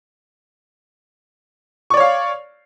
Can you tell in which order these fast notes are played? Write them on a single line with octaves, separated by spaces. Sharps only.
C#6 D5 C#5 F5